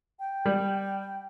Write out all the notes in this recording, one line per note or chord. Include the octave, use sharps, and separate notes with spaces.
G5
G3